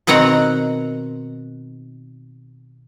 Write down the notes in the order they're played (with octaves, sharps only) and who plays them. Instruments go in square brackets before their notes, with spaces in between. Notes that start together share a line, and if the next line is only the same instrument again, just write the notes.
[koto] B2 D#3 C4 F#5 A#5